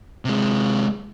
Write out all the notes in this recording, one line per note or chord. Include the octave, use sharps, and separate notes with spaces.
C3 G#3